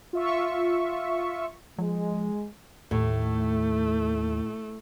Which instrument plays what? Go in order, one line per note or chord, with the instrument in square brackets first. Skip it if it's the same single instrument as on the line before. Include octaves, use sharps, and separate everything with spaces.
[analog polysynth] F4 E5 C#6
[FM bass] F3 [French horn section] G#3
[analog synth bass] D#2 [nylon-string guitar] A2 [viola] A3